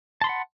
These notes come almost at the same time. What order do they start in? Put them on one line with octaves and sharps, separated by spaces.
A5 C6 B5 F#5